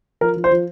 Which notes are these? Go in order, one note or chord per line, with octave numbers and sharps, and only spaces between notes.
F3 A#4
F3
C5
F3